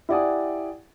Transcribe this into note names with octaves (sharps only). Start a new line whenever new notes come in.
E4 G4 D5 F#5 G#5 D#6